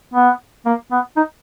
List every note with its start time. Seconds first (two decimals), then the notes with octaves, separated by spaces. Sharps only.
0.14 B3
0.66 A#3
0.91 B3
1.16 D#4